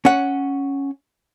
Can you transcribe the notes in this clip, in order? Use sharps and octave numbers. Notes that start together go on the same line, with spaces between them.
C#4 F#5